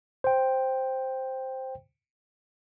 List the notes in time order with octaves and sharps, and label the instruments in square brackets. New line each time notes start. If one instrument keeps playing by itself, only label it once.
[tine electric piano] C5 G5